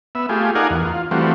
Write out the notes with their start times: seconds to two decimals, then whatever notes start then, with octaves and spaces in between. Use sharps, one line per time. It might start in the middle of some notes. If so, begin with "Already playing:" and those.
0.15 B3 E5
0.29 A3 F4 G4 G#4
0.55 D#4 A#4 D5 F5 F#5 G#5
0.70 E2
0.85 F4
1.11 E3 G3 A3 C4 F4 F#4